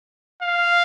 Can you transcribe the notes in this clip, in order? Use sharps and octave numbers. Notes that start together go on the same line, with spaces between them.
F5